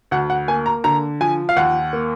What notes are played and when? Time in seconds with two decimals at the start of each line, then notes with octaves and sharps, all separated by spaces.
0.11 D2 F#5
0.30 F#5
0.48 A#3 G#5
0.66 A#5
0.84 D3 A#5
1.21 F3 G#5
1.49 F5
1.56 D#2 F#5
1.93 A#3